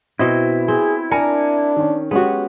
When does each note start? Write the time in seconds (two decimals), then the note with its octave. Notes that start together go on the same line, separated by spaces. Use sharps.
0.19 B2 C4 E4 D#5
0.68 C4 G#4
1.11 D4 A#4 G#5 A#5 C#7
1.76 D#3 C#4
2.11 G#3 B3 C#4 F#4 G4